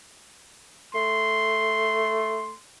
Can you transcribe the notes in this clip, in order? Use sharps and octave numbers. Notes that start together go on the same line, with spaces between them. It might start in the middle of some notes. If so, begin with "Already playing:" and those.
A3 C6